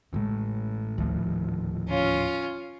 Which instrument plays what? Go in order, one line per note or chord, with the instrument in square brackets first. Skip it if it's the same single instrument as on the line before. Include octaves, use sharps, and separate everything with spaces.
[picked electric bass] A1 A2 [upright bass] C#3 G#3
[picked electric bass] D#1 A2 F3 [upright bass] D2 D#3
[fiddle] C#4 F4